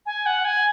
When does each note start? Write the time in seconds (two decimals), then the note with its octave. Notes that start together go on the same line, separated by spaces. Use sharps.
0.06 G#5
0.26 F#5
0.45 G#5